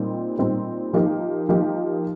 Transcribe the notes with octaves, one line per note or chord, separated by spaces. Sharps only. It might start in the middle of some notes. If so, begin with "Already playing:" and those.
Already playing: A#2 G3 C4 D#4
A#2 G3 C4 D#4
F3 A#3 D#4 G4
F3 A#3 D#4 G4